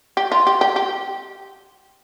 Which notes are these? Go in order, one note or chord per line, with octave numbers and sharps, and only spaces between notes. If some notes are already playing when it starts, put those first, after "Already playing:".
G4
F4
G4
G4
G4